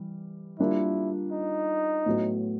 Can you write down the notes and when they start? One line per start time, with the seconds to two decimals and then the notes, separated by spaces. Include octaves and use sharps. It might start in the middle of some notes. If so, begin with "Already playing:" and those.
Already playing: E3 G3
0.59 G3 A#3 D4 E4 F4 A#4
1.32 D#4
2.06 A2 F#3 B3